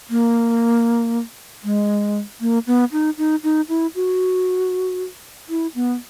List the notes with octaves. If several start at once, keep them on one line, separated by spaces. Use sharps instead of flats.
A#3
G#3
A#3
B3
D#4
D#4
D#4
E4
F#4
E4
B3